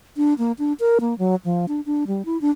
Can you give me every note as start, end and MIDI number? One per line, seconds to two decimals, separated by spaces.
0.17 0.34 62
0.38 0.52 58
0.59 0.73 62
0.80 0.98 70
1.01 1.17 58
1.18 1.35 54
1.45 1.66 53
1.68 1.81 62
1.86 2.04 62
2.07 2.25 55
2.25 2.40 64
2.41 2.50 62